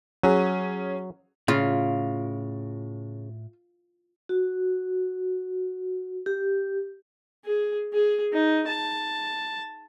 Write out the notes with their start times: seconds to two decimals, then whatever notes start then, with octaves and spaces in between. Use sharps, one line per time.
0.23 F#3 C#4 G#4
1.48 A2 C#3 F4
4.29 F#4
6.26 G4
7.45 G#4
7.93 G#4
8.33 D#4
8.67 A5